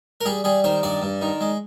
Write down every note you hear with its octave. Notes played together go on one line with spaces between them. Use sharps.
A#4
G3 G#4
G3 G#4
D#3 C5
G2 D5
G2
D#3
G#3